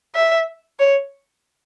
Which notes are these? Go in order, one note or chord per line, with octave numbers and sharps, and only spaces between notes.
E5
C#5